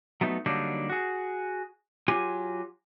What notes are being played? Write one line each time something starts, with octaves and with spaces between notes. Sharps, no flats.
F#3 A3 B3 D#4
D3 F#3 G3 A#3 D4 D#4
F#4 G#4
F#3 F4 G4 G#5